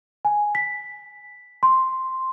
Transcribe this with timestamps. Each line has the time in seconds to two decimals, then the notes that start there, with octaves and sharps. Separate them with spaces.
0.25 G#5
0.55 B6
1.63 C6